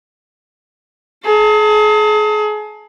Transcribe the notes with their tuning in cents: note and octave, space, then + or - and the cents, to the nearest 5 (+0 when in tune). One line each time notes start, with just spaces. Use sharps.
G#4 +35 A5 +30